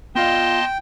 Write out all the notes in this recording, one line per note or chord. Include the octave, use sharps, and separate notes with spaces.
B3 F4 D#5 F5 G5 A5 C6